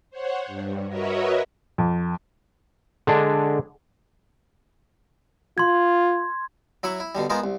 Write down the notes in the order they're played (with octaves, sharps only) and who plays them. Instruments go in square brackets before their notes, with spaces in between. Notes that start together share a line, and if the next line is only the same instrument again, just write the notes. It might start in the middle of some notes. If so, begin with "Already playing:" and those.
[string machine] C5 C#5 F#5
G2
F#4 A#4 B4 C#5 D#5 E5
[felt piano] F2
[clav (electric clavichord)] D3 G#3 D4
[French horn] F4 [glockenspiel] C6 G#6
[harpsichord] F#3 E4 E5 B5 C#6
E4
B2 D3 G3
G#3 B3 F4 A#4 C5
C2